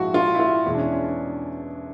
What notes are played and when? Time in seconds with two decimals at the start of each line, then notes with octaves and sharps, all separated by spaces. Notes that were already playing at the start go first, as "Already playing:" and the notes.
Already playing: A#1 G#2 F3 G#3 E4 F#4
0.14 F4
0.35 E4
0.40 F4
0.65 E2 B2 G#3 E4
0.74 D4
0.78 C#4
0.91 C#4
1.04 D4